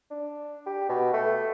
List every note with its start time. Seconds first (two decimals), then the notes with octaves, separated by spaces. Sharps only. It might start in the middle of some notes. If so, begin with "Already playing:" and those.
0.11 D4
0.66 G4
0.89 B2
1.14 A3